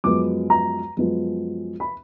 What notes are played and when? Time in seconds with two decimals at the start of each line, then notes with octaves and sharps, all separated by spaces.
0.04 F#2 F3 G#3 B3 D6
0.50 A#5
0.97 F#2 F3 G#3 B3
1.80 B5